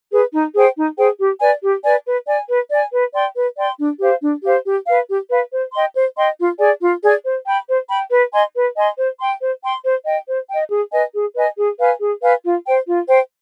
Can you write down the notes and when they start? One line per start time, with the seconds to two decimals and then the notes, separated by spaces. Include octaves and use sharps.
0.11 G#4 B4
0.32 D#4
0.53 G#4 C5 G5
0.76 D#4
0.97 G#4 C5 G5
1.19 G4
1.40 B4 D5 G#5
1.62 G4
1.83 B4 D5 G#5
2.05 B4
2.26 D5 G#5
2.48 B4
2.70 D5 G#5
2.92 B4
3.13 D5 G5 C6
3.35 B4
3.56 D5 G5 C6
3.79 D4
4.00 G4 C5 F5
4.22 D4
4.43 G4 C5 F5
4.65 G4
4.86 B4 F5
5.08 G4
5.29 B4 F5
5.51 C5
5.73 D#5 G5 C6
5.95 C5
6.16 D#5 G5 C6
6.38 F4
6.59 G#4 D5 G#5
6.81 F4
7.02 G#4 D5 G#5
7.24 C5
7.45 G5 B5
7.68 C5
7.89 G5 B5
8.10 B4
8.32 D#5 G#5 C6
8.54 B4
8.76 D#5 G#5 C6
8.98 C5
9.19 G5 C6
9.40 C5
9.62 G5 C6
9.83 C5
10.05 D#5 G5
10.27 C5
10.48 D#5 G5
10.70 G#4
10.91 B4 D#5 G#5
11.14 G#4
11.35 B4 D#5 G#5
11.56 G#4
11.79 B4 F5 G#5
12.00 G#4
12.22 B4 F5 G#5
12.44 F4
12.65 C5 G5
12.87 F4
13.07 C5 G5